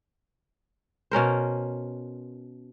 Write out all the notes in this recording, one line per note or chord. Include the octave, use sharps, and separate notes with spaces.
B2 C#4 A#4 C5